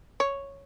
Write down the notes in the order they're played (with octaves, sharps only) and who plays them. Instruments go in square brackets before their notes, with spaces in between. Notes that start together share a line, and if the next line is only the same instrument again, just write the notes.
[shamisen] C#5